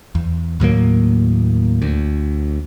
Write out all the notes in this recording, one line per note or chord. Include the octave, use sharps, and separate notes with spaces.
E2
D#2 A2 F#3 A#3
D2